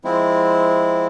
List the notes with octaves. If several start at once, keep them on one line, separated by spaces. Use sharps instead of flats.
F3 G#3 C4 E4